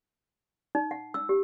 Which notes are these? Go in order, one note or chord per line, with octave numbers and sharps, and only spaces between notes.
D#4
F#5
E6
G4